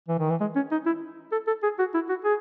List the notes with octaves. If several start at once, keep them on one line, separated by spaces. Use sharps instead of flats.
E3
D#3
E3
G#3
C#4
D#4
E4
A4
A4
G#4
F#4
E4
F#4
G#4